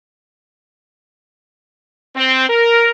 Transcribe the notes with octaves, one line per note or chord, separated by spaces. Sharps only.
C4
A#4